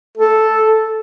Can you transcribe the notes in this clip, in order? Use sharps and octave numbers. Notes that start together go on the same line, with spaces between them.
A4